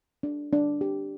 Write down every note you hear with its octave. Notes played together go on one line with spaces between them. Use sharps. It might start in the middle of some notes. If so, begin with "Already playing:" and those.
D4
D4
G4